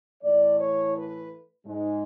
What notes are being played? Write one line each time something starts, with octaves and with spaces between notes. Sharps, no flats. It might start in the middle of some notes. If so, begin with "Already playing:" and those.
A2 E3 A3 D5
C#5
B4
G#2 G#3